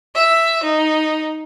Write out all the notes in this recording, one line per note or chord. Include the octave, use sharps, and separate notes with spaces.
E5
D#4